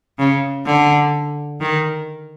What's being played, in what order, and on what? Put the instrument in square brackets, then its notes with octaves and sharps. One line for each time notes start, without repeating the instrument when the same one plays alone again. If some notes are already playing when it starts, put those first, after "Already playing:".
[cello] C#3
D3
D#3